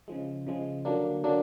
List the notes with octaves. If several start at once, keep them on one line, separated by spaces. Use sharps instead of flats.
C#3 F3 G#3
C#3 F3 G#3
D3 F#3 A#3 D4
D3 F#3 A#3 D4